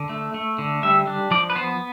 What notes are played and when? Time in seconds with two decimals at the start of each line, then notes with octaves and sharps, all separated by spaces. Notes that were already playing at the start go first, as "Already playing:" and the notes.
Already playing: D3
0.09 A3
0.34 A3
0.58 D3
0.83 G3 E5
1.07 D4
1.31 F3 D5
1.50 B4
1.55 B3 C5